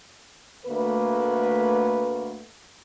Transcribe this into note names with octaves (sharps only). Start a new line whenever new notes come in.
D2 A3 A#3 B4